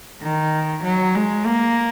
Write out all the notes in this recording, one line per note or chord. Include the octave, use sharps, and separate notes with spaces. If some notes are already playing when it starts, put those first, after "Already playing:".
D#3
F#3
G#3
A#3